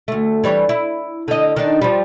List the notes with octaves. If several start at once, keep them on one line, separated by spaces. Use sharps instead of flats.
D2 A3
E3 G3 C#5
E4
D3 D#5
D#3 D4 D#4
F3 G3